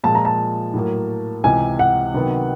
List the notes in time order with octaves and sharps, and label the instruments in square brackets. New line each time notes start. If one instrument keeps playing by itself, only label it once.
[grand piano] A#2 F3 G#3 [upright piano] A5
[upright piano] A#5
A5
[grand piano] A2 F#3 A#3
[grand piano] C#2 C3 E3 [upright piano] G#5
[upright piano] F#5
[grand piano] C3 D#3 F#3 B3